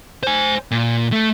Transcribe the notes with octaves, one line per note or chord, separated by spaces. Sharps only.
C5 G#5
A#2
A3